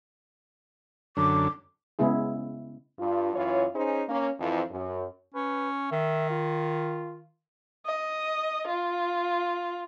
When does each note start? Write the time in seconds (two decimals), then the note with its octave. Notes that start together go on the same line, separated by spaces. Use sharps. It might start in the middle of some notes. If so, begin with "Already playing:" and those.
1.17 F#2 D3 D6
1.99 C#3 G#3 B3 E4 G#4
2.99 G2 F4
3.34 F#2 E3 F4 C#5
3.74 C#4 D#4 G#4 C5
4.09 A#3 C#4
4.39 F2 E3
4.71 F#2
5.34 C#4 B4
5.92 D#3 E5
6.30 F4
7.86 D#5
8.67 F4